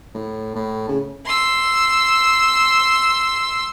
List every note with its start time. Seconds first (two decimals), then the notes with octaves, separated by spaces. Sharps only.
0.14 A2
0.55 A2
0.89 C#3
1.25 C6 E6